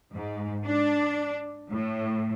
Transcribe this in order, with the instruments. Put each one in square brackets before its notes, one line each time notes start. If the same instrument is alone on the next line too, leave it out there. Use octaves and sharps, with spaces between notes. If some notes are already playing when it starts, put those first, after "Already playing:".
[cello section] G#2
D4
A2